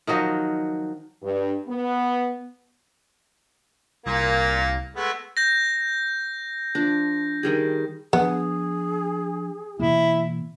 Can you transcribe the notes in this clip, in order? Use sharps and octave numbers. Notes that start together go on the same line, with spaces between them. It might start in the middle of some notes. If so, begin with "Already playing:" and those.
D#3 F3 F#3 D#5
G2
B3
C2 A#2 A#3
G#3 A3 B3
G6 A#6
F3 D4
D#3 G3 G#4
F3 B3 D4 G#4
B2 E3 A#3 E4